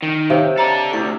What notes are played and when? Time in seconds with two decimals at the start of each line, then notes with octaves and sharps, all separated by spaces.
0.02 D#3
0.30 C3 C#5 F5
0.57 A4 D5 D#5 A#5
0.93 D2 E4 C#6